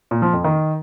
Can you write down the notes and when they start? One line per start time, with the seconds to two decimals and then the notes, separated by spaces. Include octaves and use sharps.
0.11 A#2
0.22 F3
0.33 F2
0.44 D#3